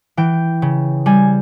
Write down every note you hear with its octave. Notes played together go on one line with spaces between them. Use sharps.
E3 G5
C#3
G3 G#5